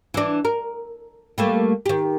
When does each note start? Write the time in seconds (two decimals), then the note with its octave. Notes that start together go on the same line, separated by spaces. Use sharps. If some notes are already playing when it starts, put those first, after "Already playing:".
0.14 E3 D4
0.45 A#4
1.38 G3 A3 A#3
1.86 D#3 G4